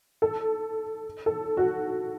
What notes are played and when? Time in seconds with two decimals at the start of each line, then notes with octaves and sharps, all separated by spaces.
0.22 A4
1.26 A4
1.57 F#4